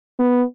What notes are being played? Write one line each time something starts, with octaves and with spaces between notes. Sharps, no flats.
B3